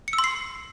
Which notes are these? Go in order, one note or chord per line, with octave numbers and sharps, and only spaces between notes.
C#7
E6
C6
C7